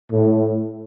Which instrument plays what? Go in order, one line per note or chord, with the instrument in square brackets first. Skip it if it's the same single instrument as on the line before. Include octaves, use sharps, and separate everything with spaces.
[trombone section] A2